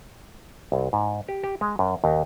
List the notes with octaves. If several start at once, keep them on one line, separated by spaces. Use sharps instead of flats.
C2
G#2
G4
G4
G#3
F#2
D#2